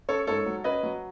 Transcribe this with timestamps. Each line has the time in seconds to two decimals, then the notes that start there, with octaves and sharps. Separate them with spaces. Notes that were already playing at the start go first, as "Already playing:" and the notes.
0.09 C#4 A4 C#5
0.27 G#2 A4 C#5
0.46 F#3
0.64 C#4 B4 D#5
0.83 F#3